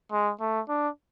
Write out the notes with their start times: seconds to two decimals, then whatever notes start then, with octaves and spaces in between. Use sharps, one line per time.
0.12 G#3
0.41 A3
0.69 D4